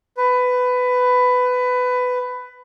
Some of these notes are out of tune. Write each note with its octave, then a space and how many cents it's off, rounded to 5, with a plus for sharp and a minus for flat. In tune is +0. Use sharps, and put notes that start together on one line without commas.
B4 +15